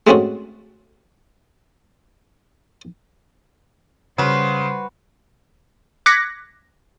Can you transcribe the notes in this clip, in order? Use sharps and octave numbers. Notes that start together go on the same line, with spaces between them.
G#3 A3 C4 C#4 F#4
C#3 G3 F#4 B4 C5
D6 F#6 G#6 A#6 B6 C#7